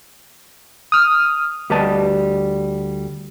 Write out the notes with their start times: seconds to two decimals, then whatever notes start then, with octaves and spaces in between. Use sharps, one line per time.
0.92 D#6 F6
1.70 D2 G3 G4 B4 D#5 A5